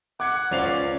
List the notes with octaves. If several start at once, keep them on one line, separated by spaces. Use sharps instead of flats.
F#5 D6 G#6 C#7
C#2 C#4 C5 D5 F5 F7